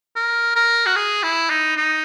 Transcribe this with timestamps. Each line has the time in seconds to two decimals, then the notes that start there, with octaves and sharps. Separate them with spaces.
0.16 A#4
0.56 A#4
0.86 F#4
0.96 G#4
1.23 E4
1.50 D#4
1.77 D#4